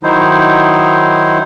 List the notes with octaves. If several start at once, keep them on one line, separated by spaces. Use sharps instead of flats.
D#3 F#3 D#4 E4 C5